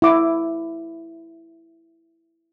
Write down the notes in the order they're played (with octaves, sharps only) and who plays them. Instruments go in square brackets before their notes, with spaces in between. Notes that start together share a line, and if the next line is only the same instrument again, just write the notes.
[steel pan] E4 D6